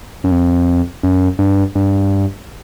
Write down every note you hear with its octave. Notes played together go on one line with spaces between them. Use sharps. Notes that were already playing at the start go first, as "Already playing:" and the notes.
F#2
F2
F#2
G2
G2